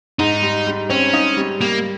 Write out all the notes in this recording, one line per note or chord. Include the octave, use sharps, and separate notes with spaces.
G#2 D#4
G3
G3
C4 C#4
D#4
G3
G3 A#3